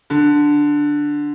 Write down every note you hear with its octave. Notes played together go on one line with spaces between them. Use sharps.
D3